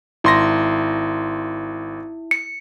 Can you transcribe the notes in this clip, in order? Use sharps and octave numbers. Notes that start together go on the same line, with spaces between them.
G#1 E4 C6 A#6
C#7